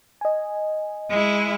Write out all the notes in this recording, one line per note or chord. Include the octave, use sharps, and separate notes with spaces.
D#5 G#5
G#3 E4